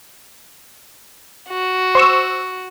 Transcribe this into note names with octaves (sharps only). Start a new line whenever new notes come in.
F#4
C5 C#6 E6